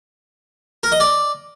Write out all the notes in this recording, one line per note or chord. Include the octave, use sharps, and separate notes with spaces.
A#4
D#5
D5